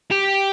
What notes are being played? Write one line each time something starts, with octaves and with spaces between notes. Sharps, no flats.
G4